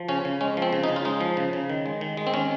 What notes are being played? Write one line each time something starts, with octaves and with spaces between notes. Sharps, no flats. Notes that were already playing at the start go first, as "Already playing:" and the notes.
Already playing: F3
C#3 C#4
C#3
G#3 C#4
F3
C4
C#3
D#4
C#3
F4
G#3 D#4
F3
C#3
C#3
D#3
G#3
D#3
G#3
C4
D#3 C#4